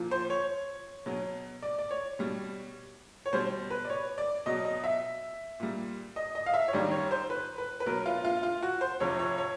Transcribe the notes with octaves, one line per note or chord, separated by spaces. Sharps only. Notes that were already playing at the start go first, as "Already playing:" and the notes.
Already playing: A#2 F3
C5
C#5
B2 F#3
D5
D5
C#5
B2 G3
C#5
B2 G3 C5
B4
D5
C#5
D5
B2 F#3 D#5
D#5
E5
A#2 G3
D#5
D#5
F5
E5
C#5
F#2 D#3 G3 D5
C#5
C5
B4
B4
B4
B2 F#3 A#4
F4
F4
F4
F#4
C5
F2 C3 F3 C#5
C#5
C#5